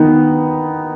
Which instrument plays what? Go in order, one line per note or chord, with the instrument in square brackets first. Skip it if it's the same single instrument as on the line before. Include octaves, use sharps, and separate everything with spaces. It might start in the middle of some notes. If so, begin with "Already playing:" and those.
Already playing: [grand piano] D#3 B3 D#4